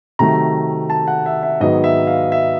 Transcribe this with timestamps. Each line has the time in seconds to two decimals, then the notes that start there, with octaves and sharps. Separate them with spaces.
0.19 C3 D#3 F#3 A3 A#5
0.90 A5
1.08 F#5
1.26 E5
1.43 E5
1.60 G#2 D#3 F#3 B3 D#5
1.84 E5
2.07 F5
2.32 E5